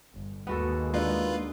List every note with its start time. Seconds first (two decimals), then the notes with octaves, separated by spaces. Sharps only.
0.14 G1
0.47 D#2 G#3 A#3 B3 F#4 A4
0.94 D3 D#4 F4 B4